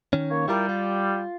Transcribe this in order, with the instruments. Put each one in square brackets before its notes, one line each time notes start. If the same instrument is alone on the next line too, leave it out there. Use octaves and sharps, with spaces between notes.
[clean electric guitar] D#3 C#4
[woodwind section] A#3 C#5
[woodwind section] G3 [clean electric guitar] E4 F4 A#4
[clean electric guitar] F4